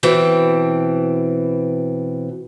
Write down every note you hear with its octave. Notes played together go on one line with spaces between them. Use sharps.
B2 E3 C4